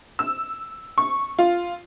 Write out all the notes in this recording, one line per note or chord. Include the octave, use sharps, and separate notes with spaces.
E6
C#6
F4